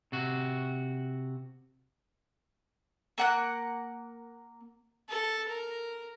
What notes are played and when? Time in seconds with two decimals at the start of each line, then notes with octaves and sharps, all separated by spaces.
0.12 C3 F#4
3.18 A#3 F#5 F#6
5.09 A4
5.48 A#4